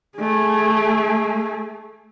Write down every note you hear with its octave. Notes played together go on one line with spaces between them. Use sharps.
A3 G#4